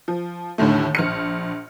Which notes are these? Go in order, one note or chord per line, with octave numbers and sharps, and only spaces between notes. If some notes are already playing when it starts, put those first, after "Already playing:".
F3
D#2 A2 D3 D#3 A3
A#1 F6 C#7